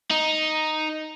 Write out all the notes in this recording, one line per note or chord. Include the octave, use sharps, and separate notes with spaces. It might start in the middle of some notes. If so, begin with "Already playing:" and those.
D#4